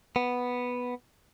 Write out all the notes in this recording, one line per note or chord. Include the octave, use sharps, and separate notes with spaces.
B3